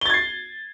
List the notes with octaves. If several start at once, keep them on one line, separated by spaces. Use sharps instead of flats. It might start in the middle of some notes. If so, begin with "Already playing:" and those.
G#6 A6 C7 G7